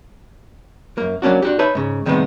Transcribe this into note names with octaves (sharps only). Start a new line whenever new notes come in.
F#2 A#3
F#3 A#3 C#4 D4 F#4
D4 F#4 G4
D#4 B4 C#5 E5 A5 B5
G#2 C#3
A2 C3 D#3 G3 G#3 B3